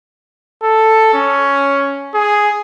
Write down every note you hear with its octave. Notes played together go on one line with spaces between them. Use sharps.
A4
C#4
G#4